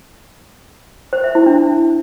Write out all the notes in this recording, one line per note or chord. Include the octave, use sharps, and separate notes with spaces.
C5
E5
E4
D4